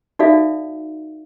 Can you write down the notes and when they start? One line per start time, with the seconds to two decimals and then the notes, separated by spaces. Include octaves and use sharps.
0.19 D#4 F#4 A4 D5 E5 F5